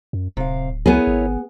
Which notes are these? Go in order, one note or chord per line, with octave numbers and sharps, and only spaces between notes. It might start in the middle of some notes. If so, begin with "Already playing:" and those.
F#2
D1 C3 F5
C#2 B3 E4 G#4 A#4 C#5
G#1